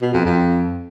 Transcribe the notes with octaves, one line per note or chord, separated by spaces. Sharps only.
B2
F2
F2